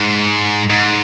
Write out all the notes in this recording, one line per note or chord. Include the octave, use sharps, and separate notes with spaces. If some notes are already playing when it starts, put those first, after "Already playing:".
Already playing: G#2
G#2